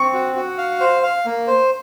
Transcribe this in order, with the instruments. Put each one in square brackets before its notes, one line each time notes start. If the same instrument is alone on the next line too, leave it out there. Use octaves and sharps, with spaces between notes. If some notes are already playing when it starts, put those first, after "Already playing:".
Already playing: [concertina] C4 [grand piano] C#6
[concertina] F#4
F#4
F5
C5
F5
A#3
C5